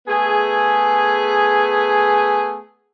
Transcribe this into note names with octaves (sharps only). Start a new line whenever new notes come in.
A3 B3 G#4